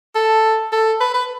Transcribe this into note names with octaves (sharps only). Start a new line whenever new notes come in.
A4
A4
B4
B4